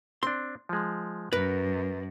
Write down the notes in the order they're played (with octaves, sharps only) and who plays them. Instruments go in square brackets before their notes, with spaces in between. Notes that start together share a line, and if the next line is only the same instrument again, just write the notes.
[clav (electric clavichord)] C4 D4 [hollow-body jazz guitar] C6
[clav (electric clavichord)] F3 G#3
[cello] F#2 [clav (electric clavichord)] A#4 [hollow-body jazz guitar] B4